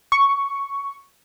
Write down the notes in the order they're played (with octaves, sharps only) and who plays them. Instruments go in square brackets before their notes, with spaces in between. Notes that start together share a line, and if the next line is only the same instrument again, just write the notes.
[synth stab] C#6